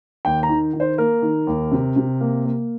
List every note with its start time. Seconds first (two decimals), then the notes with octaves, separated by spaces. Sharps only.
0.25 D#2 G5
0.43 A#5
0.49 D#3
0.74 D#3
0.80 C5
0.98 A#3 A#4
1.22 D#3
1.47 D#2
1.71 C3
1.96 C3
2.21 A#3
2.45 A#3